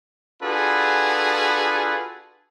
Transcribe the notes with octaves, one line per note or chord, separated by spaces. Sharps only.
D4 F4 F#4 G#4 A4 B4